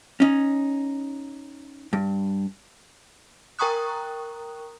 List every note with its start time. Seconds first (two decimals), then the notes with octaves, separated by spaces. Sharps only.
0.20 C#4 D#4
1.93 G2
3.59 A#4 G5 A#5 C#6 D#6 F#6